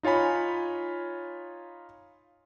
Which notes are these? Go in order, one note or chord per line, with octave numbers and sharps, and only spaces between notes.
D#4 F4 C#5 G#5 B5